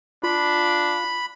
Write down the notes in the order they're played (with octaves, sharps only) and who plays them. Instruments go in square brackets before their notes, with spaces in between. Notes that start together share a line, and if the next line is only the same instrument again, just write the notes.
[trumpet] D4 [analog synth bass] F4 [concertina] B5